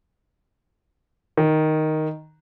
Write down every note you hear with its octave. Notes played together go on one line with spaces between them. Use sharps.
D#3